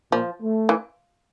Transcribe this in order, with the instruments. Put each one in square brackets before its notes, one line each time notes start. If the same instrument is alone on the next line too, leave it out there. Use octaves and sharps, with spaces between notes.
[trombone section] A#2 [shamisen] F3
[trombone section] A3
[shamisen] E3